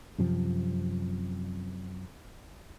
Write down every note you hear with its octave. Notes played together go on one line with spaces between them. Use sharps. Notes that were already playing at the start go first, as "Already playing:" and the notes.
F#2 C3 F3 C4